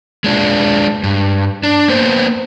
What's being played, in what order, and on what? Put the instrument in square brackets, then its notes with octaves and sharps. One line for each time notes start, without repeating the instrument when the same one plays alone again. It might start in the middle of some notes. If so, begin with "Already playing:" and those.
[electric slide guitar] G#3 D4 F4
G2
D4
A#3 B3 C5